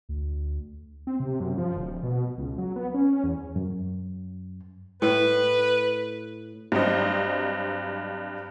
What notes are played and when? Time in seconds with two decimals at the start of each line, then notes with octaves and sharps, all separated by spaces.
0.09 D2
1.07 C4
1.20 C3
1.40 F#2
1.58 F3
1.76 D1
2.03 B2
2.38 C#2
2.58 F#3
2.76 B3
2.94 C#4
3.24 E2
3.56 F#2
5.02 A2 B4
6.72 G2 F#3 C4 C5 D#5